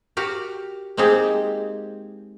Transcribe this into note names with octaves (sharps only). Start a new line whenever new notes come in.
F#4 G4 A#4
G#3 A#3 C4 D#4 G4 G#4